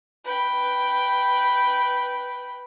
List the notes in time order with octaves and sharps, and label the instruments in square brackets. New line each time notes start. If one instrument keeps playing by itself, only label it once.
[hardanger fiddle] B4 G5